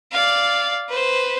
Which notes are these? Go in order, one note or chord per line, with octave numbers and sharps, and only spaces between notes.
D5 F5
B4 C5